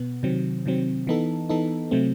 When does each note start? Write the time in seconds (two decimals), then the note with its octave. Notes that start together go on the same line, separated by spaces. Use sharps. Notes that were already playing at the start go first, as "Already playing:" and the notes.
Already playing: B2 B3
0.23 C3 D#3 F#3 C4
0.66 C3 D#3 F#3 C4
1.07 E3 B3 D#4 A4
1.49 E3 B3 D#4 A4
1.91 C3 F#3 A3 C4